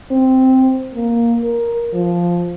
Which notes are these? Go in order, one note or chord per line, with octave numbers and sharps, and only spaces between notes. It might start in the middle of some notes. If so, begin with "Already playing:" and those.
C4
A#3
A#4
F3